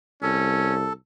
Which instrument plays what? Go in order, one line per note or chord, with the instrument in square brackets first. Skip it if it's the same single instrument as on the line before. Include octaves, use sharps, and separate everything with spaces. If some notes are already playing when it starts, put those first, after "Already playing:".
[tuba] C2 [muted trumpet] C#4 [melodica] A4